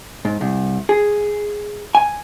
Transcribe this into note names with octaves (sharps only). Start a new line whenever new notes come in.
G#2
C2
G#4
G#5